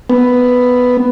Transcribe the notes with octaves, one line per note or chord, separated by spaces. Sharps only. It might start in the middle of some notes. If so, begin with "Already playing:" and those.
B3